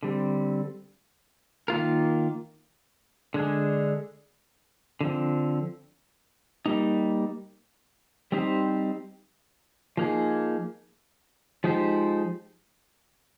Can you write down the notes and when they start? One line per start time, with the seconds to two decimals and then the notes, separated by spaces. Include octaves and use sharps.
0.03 D3 G3 C4
1.68 D#3 A#3 F4 A#4
3.34 D3 G#3 D4 G#4
5.01 D3 F3 C4
6.66 G3 A#3 D#4
8.32 G3 C4 D#4 G4 C5
9.97 F3 A#3 D#4 G#4
11.64 F3 G#3 D#4 G4 C5